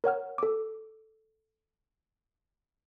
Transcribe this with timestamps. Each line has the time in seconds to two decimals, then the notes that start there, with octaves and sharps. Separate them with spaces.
0.04 A#4 C#5 F#5 F6
0.38 A4 D6